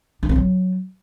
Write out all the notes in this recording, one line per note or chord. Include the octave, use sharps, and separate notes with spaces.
D4
C4
F#3